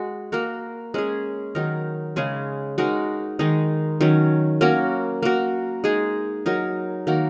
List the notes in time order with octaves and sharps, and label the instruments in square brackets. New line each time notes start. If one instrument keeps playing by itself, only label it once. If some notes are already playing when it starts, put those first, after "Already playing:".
Already playing: [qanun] G#3 F#4
A#3 F#4 A#4
G#3 C#4 G#4
D#3 F#3 D#4 A#4
C#3 G#3 C#4
G#3 D#4 F#4 A#4
D#3 G#3 D#4
D#3 F#3 C#4
A#3 C#4 F#4 A#4
A#3 F#4 A#4
G#3 D#4 G#4
F#3 D#4 A#4
D#3 A#3 F#4 A#4